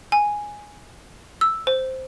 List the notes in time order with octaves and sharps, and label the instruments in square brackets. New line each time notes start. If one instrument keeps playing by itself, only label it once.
[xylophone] G#5
E6
C5